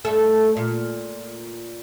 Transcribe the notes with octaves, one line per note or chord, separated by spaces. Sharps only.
G2 A3 A4
A#2